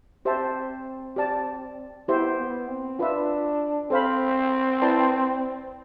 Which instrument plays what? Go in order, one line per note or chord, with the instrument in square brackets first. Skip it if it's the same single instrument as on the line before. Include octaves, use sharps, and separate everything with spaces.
[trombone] C4 [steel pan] G4 C5 E5 A5
[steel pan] G4 D5 A5
[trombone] B3 [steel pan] E4 G4 C5 E5
[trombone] B3
C4
[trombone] D4 [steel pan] F4 B4 E5
[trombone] C4 [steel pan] A4 C5 F5 B5
[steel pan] E4 B4 D5 A5 C6